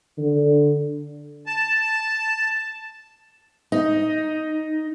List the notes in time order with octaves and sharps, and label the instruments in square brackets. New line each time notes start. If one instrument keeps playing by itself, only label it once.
[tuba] D3
[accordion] A5
[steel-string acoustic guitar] D#4